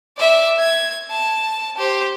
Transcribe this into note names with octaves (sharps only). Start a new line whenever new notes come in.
D5 E5
G#6
A5
G4 C5